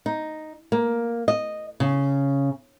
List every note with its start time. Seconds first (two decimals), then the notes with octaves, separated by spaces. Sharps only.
0.06 D#4
0.72 A#3
1.28 D#5
1.80 C#3